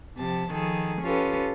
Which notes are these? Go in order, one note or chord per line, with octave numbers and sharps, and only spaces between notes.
C3 F3 A5 A6
D#3 F3 G#4 A4
C#4 F4 G4 A4 B4